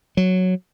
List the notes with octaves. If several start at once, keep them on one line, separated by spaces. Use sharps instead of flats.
F#3